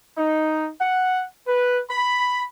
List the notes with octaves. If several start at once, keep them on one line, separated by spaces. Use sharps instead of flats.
D#4
F#5
B4
B5